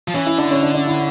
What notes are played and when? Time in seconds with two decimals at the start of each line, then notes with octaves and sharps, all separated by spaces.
0.08 F3
0.14 E3 C#4
0.27 E4
0.38 D3 D4
0.51 C#4
0.63 D4
0.74 D4
0.87 E4